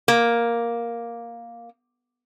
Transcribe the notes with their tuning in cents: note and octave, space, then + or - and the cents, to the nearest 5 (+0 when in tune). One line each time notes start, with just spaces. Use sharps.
A#3 +5